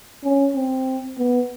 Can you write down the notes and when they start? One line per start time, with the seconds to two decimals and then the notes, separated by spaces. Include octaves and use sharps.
0.24 C#4
0.56 C4
1.18 B3